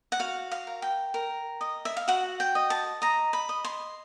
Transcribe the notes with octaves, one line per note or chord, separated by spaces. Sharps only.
F#5
F#4 F5
F5
A#4
G5
A#4
D#5
E5
F5
F#4 F#5
G5
D#5
A5
D#5 A#5
B5
D#5
C6